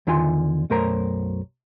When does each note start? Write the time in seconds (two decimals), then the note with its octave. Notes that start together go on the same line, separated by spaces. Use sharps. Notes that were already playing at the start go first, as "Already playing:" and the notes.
0.07 E2 D3 D#3 F4 G#5 C6
0.70 B1 F#2 A3 A#4 C5 A#5